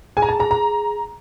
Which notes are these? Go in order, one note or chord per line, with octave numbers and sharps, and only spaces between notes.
G#4 G#5
A#5
A5
G#4 A#5
A#5